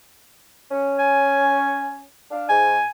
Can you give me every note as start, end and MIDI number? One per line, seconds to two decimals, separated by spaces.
0.71 2.02 61
0.99 2.02 80
2.31 2.47 62
2.31 2.47 77
2.49 2.79 44
2.49 2.89 80